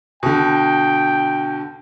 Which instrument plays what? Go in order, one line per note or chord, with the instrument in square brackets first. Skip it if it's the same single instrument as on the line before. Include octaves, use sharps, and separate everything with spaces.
[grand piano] B2 D3 [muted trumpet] G5